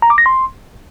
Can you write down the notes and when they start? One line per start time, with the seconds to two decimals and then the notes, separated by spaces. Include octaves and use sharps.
0.02 A#5
0.10 D6
0.18 A#6
0.26 C6